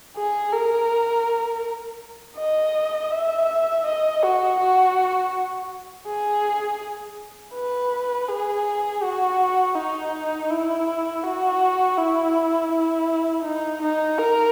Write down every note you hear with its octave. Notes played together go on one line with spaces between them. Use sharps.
G#4
A#4
D#5
E5
D#5
F#4
F#4
G#4
B4
G#4
F#4
D#4
E4
F#4
E4
E4
D#4
D#4
A#4